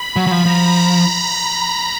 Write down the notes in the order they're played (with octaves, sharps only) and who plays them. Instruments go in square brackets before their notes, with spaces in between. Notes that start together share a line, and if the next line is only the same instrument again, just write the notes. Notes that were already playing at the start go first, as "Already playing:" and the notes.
Already playing: [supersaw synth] B5
[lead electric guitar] F#3
F#3
F3
[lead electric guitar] F3 [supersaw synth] A#5